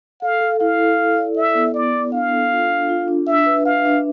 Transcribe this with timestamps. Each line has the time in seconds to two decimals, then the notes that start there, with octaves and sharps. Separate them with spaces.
0.22 A4 F5
0.41 A4
0.60 E4 F5
0.79 A4
0.98 E4
1.18 D5
1.37 E4 E5
1.55 B3
1.74 B3 D5
1.94 A4
2.13 D4 F5
2.32 A4
2.52 F4
2.70 D4
2.89 F4
3.08 D4
3.27 D4 E5
3.46 B4
3.65 E5 F5
3.85 D4